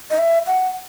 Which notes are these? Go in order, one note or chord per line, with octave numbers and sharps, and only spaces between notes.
D#5
E5
F#5